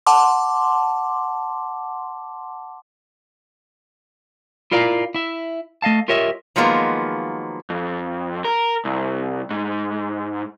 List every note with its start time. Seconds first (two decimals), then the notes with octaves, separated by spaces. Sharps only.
0.06 F#5 A5 C6 D6
4.71 E4 F4 A#4 D5 F5 A#5
5.15 E4 E5
5.82 A3 D#5 F5 A5
6.08 F4 G4 A#4 C#5 D#5 E5
6.56 D#3 F3 F#3 G#3 A#3 B3
7.70 F2
8.45 A#4
8.85 C2
9.51 G#2